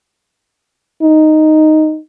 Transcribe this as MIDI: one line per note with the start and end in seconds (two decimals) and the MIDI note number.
1.03 1.99 63